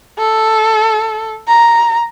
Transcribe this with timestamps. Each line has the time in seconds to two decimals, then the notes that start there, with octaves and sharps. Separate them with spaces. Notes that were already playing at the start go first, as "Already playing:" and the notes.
0.19 A4
1.48 A#5